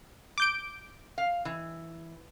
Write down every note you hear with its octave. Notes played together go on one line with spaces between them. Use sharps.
D6 G6 D7
F5
E3